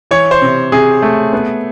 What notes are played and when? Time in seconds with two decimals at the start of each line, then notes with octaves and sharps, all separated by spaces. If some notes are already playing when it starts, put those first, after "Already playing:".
0.11 E3 C#5
0.31 C5
0.42 C3
0.72 C3 G#4
1.02 A3
1.33 B3